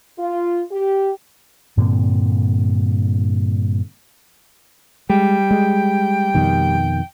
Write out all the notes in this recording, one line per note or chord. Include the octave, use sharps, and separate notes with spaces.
F4
G4
G2 A#2 D3 C4
G3 G#3 G5
G#3
F2 B2 D#3